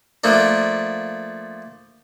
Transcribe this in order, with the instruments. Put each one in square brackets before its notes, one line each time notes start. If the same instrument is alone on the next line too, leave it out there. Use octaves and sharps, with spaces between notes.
[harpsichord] F3 A3 A#3 D4